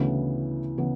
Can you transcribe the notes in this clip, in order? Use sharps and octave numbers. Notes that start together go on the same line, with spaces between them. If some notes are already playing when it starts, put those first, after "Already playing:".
Already playing: D2 C#3 E3 B3 E4
C#3 E3 B3 E4